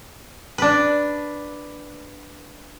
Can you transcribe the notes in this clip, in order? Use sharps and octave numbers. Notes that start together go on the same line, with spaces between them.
D4 B4